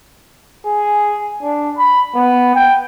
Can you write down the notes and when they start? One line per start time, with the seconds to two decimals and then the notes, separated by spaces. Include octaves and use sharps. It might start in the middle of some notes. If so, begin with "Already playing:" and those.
0.65 G#4
1.42 D4
1.77 B5
2.15 B3
2.55 G5